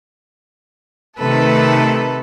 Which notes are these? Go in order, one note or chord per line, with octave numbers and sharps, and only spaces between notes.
C3 D#3 A3 A4 B4